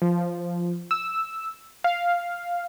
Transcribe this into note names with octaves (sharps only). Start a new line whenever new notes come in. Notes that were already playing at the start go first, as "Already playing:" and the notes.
F3
E6
F5